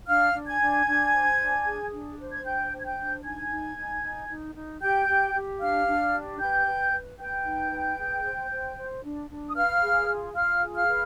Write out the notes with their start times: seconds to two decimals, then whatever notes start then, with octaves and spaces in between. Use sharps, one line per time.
0.07 D4 F5 F6
0.34 D4
0.47 G#5 G#6
0.61 D4
0.86 D4
1.13 C5
1.39 D4
1.65 G#4
1.92 D4
2.19 C5
2.32 G#6
2.44 D4 G5 G6
2.71 C5
2.79 G#6
2.84 G5 G6
2.97 D4
3.23 D#4 G#5 G#6
3.50 D#4
3.76 D#4
4.02 D#4
4.29 D#4
4.56 D#4
4.81 G4 G5 G6
5.08 G4
5.34 G4
5.60 D4 F5 F6
5.87 D4
6.13 G4
6.39 B4 G5 G6
6.66 B4
6.92 B4
7.19 B4 G5 G6
7.45 D#4
7.71 B4
7.98 G#4
8.24 C5
8.50 C5
8.76 C5
9.03 D4
9.29 D4
9.49 D#6
9.55 B4 F5 F6
9.82 G#4
10.08 F4
10.34 F4 F5 F6
10.61 G#4
10.74 F5 F6
10.88 B4